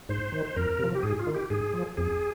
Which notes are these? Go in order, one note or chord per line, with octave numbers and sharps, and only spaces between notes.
G#2 C5
D#3
C5
F2 A#4
C3 F3
G4
G#2 G#4
F4
D#3
G4
G#2 G#4
F3
F2 G#4